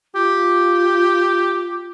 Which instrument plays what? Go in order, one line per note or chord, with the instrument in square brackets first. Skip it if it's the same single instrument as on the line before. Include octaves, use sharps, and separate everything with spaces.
[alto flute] F4 [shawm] G4